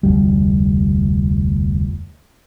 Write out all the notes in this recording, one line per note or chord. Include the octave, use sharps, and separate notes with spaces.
F1 D2 G3